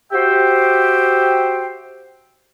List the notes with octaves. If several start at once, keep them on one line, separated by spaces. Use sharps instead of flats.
F#4 G4 C5 E5 G5